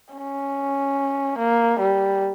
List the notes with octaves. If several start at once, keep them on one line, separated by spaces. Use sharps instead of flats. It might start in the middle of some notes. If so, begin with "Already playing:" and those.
C#4
A#3
G3